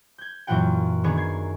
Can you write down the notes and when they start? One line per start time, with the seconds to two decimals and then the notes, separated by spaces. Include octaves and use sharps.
0.18 G6 G#6
0.47 F#2 A#2 E3 F4 F#5 G5
1.04 D#3 B3 D4 G#4
1.17 G#6 C7